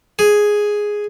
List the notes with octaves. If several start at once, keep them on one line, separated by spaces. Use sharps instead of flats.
G#4